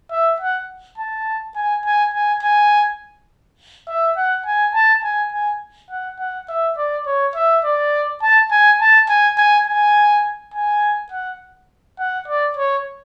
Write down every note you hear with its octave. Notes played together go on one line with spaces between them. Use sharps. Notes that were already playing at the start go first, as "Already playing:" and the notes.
E5
F#5
A5
G#5
G#5
G#5
G#5
E5
F#5
G#5
A5
G#5
G#5
F#5
F#5
E5
D5
C#5
E5
D5
A5
G#5
A5
G#5
G#5
G#5
G#5
F#5
F#5
D5
C#5